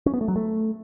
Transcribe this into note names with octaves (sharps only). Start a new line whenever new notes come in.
C#4
B3
A3
F#3
A3